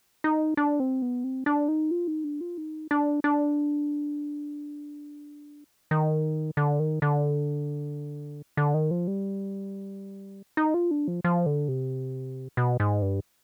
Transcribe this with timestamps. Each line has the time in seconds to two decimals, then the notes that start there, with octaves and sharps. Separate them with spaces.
0.24 D#4
0.57 D4
0.80 C4
1.02 B3
1.24 C4
1.46 D4
1.68 D#4
1.91 F4
2.07 D#4
2.24 D4
2.41 F4
2.58 D#4
2.91 D4
3.24 D4
5.91 D#3
6.57 D3
6.80 D#3
7.02 D3
8.57 D3
8.74 D#3
8.91 F3
9.07 G3
10.57 D#4
10.74 F4
10.91 D4
11.08 F3
11.24 F3
11.46 D3
11.68 C3
12.57 B2
12.80 G#2
13.02 G2